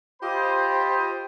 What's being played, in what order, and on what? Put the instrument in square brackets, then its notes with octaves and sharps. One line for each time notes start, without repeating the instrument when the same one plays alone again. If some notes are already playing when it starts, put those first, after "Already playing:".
[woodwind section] F4 C5 [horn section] G4 D#5 B5